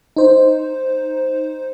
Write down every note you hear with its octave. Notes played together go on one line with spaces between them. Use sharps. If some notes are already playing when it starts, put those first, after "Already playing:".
D#4 C5